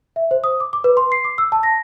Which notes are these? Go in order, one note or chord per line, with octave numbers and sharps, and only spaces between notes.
E5
C5
D#6
D6
D6
B4
C6
C7
D6
E6
A5
A#6